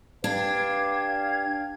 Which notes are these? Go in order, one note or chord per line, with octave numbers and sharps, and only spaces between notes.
D4 G4 B4 F5 G#6